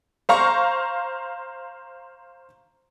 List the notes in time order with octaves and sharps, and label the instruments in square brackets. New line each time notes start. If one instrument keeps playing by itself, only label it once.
[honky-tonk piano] C5 F5 A#5 C#6